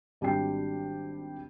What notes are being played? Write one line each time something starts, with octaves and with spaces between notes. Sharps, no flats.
G#1 G3 D4 F#4 G5 C7